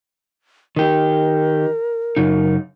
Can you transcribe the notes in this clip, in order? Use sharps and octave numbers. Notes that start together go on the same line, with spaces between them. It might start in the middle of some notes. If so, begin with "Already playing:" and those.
D#3 G4 A#4
F#2 C#3 D#4